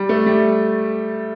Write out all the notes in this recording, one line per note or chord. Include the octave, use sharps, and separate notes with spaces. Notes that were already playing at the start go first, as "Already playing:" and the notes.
Already playing: G3
A3
G3